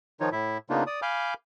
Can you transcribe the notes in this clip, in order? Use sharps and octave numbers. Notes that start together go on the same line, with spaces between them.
D#3 F3 D#4 F4 C#5
A2 E4 E5
C#3 A#3 B3 D4 D#4 F4
D5 D#6
F5 G#5 B5 D6 F6 G6